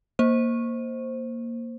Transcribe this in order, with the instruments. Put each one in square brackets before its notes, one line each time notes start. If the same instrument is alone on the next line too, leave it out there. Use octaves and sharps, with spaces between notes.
[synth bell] A#3 C5